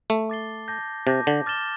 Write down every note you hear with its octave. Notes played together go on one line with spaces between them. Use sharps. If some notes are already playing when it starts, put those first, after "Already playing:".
A3
A5 D6 A6 C7 G7
A5 D6 G6 A#6
C3 A5 D6 G6 A#6
D3
D6 F6 A6 E7 G7